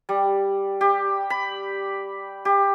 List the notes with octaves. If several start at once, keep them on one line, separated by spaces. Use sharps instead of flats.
G3
G4
B5
G4